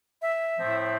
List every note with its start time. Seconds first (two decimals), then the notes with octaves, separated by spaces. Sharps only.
0.22 E5
0.59 A2 F3 A3 C4